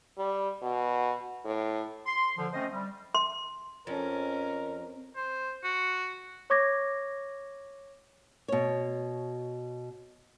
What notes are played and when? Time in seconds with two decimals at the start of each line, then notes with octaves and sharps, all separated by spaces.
0.18 G3
0.62 B2
1.45 A2
2.07 C6
2.37 A#2 D3 F3
2.53 A3 C4 C#4 C5 D#5
2.73 G3
3.15 C6
3.87 F2 C#4 A#4
5.16 C5
5.64 F#4
6.50 C#5 C#6 D6 G#6 A#6
8.48 B2 C#5